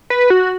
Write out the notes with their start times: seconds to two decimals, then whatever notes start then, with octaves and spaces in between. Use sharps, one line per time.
0.10 B4
0.30 F#4